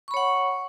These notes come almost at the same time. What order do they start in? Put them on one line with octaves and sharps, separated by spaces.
C#6 B5 C#5 F#5